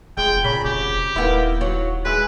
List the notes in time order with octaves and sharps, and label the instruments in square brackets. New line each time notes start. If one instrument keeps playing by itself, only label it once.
[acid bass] F1 [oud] G#3 [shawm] G5
[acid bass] A#2 [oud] C#3 [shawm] B5
[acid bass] F1 [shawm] G4
[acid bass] D#1 [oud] A#3 B3 E4
[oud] F#3
[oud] G#3 E5 [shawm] B4